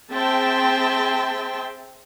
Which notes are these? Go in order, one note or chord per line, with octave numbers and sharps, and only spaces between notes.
C4 G#4 E5 G5 A5 C6